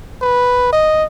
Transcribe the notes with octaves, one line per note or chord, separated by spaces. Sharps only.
B4
D#5